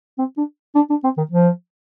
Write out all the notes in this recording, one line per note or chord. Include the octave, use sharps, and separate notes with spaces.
C4
D4
D4
D4
C4
D#3
F3